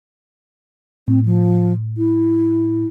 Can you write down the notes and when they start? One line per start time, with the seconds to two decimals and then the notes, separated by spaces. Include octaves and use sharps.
1.08 A2 C4
1.25 F3
1.97 E4